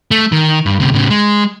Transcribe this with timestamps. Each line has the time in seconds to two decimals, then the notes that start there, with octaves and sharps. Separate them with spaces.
0.11 A3
0.32 D#3
0.66 G2
0.79 D2 C3
0.94 A2 C#3
1.10 G#3